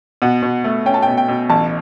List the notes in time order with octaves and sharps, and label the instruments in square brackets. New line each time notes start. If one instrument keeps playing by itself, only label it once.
[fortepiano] B2 [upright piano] F#5
[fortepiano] B2
A3
[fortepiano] C#4 [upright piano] G5
[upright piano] A5
[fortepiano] B2 [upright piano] G5
[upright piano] G5
[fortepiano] B2
[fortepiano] A1 [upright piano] A5